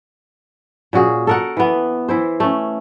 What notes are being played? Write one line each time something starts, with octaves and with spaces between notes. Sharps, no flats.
A#2 C#4 F#4 G#4
A4 A#4 F#5
E3 B3
E3 E4 C5
A3 C#4